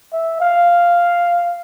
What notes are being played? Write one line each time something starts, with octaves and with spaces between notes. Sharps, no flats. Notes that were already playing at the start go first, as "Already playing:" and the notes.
E5
F5